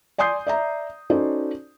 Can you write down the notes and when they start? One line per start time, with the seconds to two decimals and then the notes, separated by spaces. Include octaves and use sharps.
0.18 D5 G#5 C6 D#6 G6 C7
0.47 D5 E5 A#5
1.10 C#4 D#4 F#4 A4 C5 D5